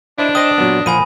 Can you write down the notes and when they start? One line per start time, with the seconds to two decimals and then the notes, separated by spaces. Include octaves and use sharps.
0.18 D4 E4 C5 D#5
0.35 C5 D#5 G5 D#6 A#6 E7
0.58 A#2 F#3 B3
0.86 A#2 F3 F#5 G#5 B5 D#7